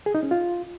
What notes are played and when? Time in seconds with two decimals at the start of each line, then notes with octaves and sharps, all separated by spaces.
0.06 G#4
0.15 D#4
0.23 C#4
0.31 F4